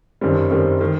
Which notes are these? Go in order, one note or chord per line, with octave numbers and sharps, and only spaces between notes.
F#1 F#2 D#3 G3 C4
F#1 F#2 D#3 G3 C4
D#3